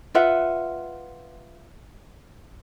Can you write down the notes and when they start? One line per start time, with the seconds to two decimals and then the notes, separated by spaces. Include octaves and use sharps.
0.15 F4 B4 E5 F#5